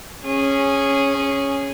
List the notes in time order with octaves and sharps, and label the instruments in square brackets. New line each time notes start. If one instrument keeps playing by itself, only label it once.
[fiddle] C#4 G#4